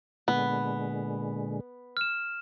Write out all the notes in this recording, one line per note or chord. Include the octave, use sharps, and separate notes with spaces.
A#2 D3 G#3 B3
F6 E7